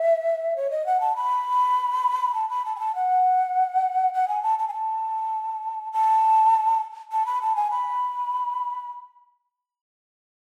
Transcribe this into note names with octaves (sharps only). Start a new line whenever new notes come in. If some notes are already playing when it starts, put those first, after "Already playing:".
Already playing: E5
C#5
D#5
F#5
A5
B5
A5
B5
A5
G#5
A5
F#5
F#5
G#5
A5
A5
G#5
A5
A5
A5
B5
A5
G#5
B5